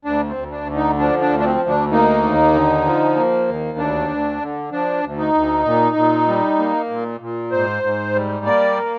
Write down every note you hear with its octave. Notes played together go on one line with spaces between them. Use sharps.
D2 D4
C4
D2
D4
D3
D#4
F3 D4
D4
D2
D4
C4
D2
D4
A#3 D#4
D#2
D3
F3
A#3
D#2
D2 D4
D2
D3
F3 D4
D2
D#4
D2
A#2
A#2
G3
A#3
A#2
A#2
G#2 C5
G#2
G3
A#3 D5